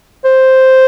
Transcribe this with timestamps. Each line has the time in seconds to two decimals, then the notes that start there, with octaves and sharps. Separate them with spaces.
0.25 C5